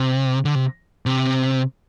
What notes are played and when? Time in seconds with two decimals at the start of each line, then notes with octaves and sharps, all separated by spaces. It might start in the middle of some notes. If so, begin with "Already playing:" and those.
Already playing: C3
0.45 D3
0.55 C3
1.06 C3